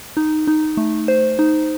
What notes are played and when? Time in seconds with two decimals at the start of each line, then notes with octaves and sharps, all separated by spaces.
0.17 D#4
0.47 D#4
0.77 A3
1.08 C5
1.39 D#4